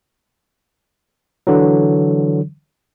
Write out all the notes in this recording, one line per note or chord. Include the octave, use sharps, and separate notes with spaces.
D3 E3 F#3